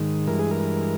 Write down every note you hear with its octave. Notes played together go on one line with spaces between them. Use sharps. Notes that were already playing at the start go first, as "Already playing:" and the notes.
Already playing: G#2 D#3
G2 E3 G#3 A#4
G#4
A#4